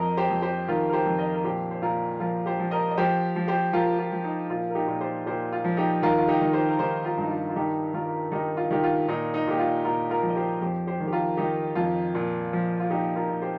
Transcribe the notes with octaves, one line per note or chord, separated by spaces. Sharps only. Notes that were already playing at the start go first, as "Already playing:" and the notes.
Already playing: F2 A#4 D#5
G4 C5
F2
G4 C5
D#3 F4 A#4
A#4
G4 C5
F2
A#4 D#5
A#4
A#2 G4 C5
C5
A#2 F4 A#4
F3 F4 A#4
G4 C5
F3
A#4 D#5
D#5
F3 G4 C5
F3
G4 C5
F3 F4 A#4
F4
F3
D#4
A#2 F4
A#4
D#4 G4
A#2
G4 C5
A#2 G4 C5
F4
F3
D#4 G4
D#3 F4 A#4
F4
D#4 G4
D#3
G4 C5
A#4
D#3 G4 C5
F4 A#4
G2
D#4
F4
F4
D#3 D#4 G4
D#3 F4 A#4
D#3 D#4 G4
F4
D#3 G4
F4
A#2 D#4
D#4
A#2 G4
F4
A#2 F4 A#4
F4 A#4
F3
D#5
G4 C5
F2 G4 C5
G4 C5
D#3
G4
F4 A#4
D#3 D#4 G4
F2 F4
A#2
F3
F4
A#2 D#4 G4
F4 A#4
A#2
G4 C5